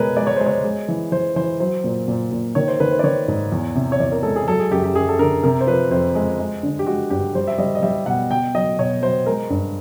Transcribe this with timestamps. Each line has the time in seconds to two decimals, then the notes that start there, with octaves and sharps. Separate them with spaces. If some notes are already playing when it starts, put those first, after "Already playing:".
Already playing: B2 G#3 A#4 B4 C#5
0.16 G#3 D5
0.27 C#5
0.36 G#3 C5
0.46 C#5
0.64 G#3
0.88 E3
1.12 E3 C5
1.36 E3 C5
1.60 F#3 C5
1.84 A#2
2.08 A#2
2.31 A#2
2.55 D#3 C#5
2.68 C5
2.80 D#3 B4
2.92 C5
2.99 D5
3.04 D#3 C#5
3.28 G#2
3.52 E2
3.75 C3
3.92 C#5
4.00 E2 D5
4.12 A#4
4.23 G#3 A4
4.36 G#4
4.48 F#3 A4
4.59 G#4
4.71 F#2 G4
4.84 G4
4.95 F#2 G#4
5.09 A4
5.19 D3 A#4
5.43 C3 A#4
5.61 C5
5.67 F3 B4
5.91 F2 C5
6.15 G#3
6.39 G#3
6.63 D3
6.79 G4
6.87 G#3 F#4
7.10 G2 G4
7.35 G3 C5
7.47 E5
7.58 G3 D#5
7.75 D#5
7.83 G3 E5
8.06 B2 F#5
8.30 B2 G5
8.55 F#3 D#5
8.79 B2 C#5
9.02 F#3 C5
9.26 G#3 A#4
9.50 G2